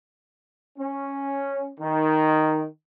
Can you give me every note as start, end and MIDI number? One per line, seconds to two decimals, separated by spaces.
0.78 1.70 61
1.80 2.65 51